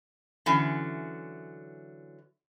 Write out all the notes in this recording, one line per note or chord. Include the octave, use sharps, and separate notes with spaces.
D3 E3 F#3 C#4